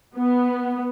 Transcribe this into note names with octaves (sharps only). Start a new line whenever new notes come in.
B3